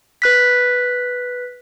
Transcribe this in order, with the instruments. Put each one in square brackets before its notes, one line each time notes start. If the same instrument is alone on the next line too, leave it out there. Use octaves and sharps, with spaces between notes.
[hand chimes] B4 F#6 B6